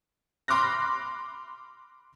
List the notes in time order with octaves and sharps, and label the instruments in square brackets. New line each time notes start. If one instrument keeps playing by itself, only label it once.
[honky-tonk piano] B5 C6 D6 F6 F#6 A#6